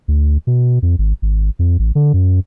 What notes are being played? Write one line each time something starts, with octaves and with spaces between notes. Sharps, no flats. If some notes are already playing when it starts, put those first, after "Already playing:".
D2
B2
F2
G#1
G#1
F2
A1
D3
F#2